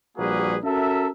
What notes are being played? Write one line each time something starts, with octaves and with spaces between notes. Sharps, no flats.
A#1 G3 A#3 F#4 G#4 B4
C#4 F#4 A4 A#4 E5